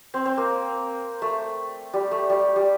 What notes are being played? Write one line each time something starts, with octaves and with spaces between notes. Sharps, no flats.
C4
C4
A#3
A3
G3
A3
G3
G3